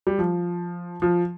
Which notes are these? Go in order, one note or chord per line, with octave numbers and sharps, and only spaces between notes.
G3
F3
F3